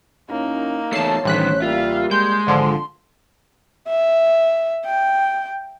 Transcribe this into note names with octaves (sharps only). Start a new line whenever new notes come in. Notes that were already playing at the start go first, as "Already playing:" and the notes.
F#2 A#3 C#4 D#4 E4
E2 A3 C#5 A5 C7
A1 G2 D#3 C5 F#6 B6
G3 A#3 F4 E5 F5
G#3 C6 G6
G#1 D3 F3
E5
G5